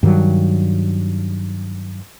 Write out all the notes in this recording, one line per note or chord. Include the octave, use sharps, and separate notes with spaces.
G2 D#3 F#3